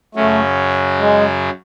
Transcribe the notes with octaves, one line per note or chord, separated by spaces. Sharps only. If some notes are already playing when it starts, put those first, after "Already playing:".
F#2 C#3 F#3 A3 C#4
G#3